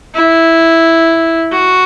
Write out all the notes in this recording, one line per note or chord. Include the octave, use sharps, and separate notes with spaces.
E4
F#4